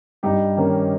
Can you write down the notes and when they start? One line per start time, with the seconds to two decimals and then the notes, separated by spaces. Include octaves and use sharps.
0.23 G2 D#4 G4
0.57 D#3 A#3 C#4